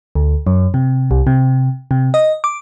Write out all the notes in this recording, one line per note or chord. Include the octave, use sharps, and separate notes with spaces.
D2
F#2
C3
C2
C3
C3
D#5
D6